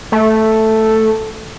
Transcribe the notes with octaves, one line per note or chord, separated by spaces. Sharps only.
A3